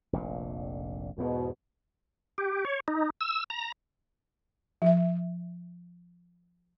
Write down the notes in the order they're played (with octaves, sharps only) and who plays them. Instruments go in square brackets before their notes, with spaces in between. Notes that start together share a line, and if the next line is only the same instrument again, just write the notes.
[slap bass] F1 A#1 A#2
[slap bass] E2 G#2 [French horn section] B2
[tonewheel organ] G4
C#5
D#4
E6
A#5
[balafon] F3 E5